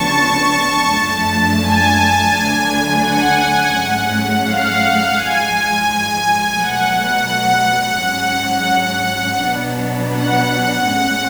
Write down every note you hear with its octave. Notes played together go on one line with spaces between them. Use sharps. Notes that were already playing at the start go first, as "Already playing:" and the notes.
Already playing: D2 C#3 F3 B3 D4 A5 C#6
F#2 F3 A3 D4
G#5
D2 D3 F#3 A3 D4
F#5
G#2 F#3 A3 C#4
F5
G#2 F3 G#3 G#5
B2 F#3 A3 F#5
F#5
G#2 F#3 C#4
B2 F#3 B3 D4
F#5
A2 G#3 C#4 F#5